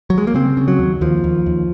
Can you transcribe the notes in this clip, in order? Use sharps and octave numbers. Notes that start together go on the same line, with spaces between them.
F#3
G#3
A#3
C#3 C4
C#3
F#3
D#2
D#2 F3
D#2
D#2